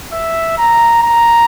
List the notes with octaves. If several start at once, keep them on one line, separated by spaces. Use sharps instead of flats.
E5
A#5
A#5